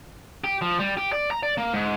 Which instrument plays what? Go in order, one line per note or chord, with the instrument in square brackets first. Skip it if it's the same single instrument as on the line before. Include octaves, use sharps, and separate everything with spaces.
[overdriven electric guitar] G4
F3
G3
G4
D5
A#5
D5
A#3
G#2